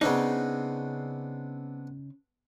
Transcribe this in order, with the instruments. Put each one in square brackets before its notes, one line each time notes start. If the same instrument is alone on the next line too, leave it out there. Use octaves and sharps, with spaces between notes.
[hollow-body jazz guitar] C#3 D#4 [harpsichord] B3 C4 D4